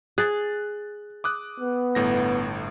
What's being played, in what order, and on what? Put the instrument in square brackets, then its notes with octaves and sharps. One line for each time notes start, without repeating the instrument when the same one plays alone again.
[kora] G#4 [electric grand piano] F#6 A6
[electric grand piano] D6 D#6 F#6
[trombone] B3
[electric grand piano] G1 A2 A#6